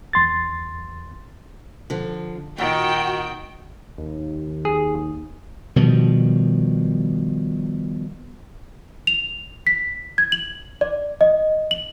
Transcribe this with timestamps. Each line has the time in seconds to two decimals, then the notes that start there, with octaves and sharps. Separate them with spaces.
0.13 E2 C6 A6
1.90 D3 F3
2.58 A#2 D#3 F#4 G5
3.98 D#2
4.65 G#4
5.76 B2 D#3 F3 G3
9.07 F7
9.67 B6
10.18 G#6
10.32 F#7
10.81 D5
11.21 D#5
11.71 F#7